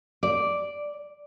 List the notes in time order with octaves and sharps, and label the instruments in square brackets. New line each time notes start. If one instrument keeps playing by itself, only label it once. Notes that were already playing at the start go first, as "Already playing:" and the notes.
[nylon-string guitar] D5